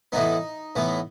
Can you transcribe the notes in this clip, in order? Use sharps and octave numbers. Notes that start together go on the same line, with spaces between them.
A2 E3 B3 D#4
A2 E3 B3